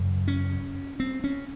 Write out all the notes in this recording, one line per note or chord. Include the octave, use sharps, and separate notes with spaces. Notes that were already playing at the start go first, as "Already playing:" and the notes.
Already playing: F#2 C#3
C#4
C4
C#4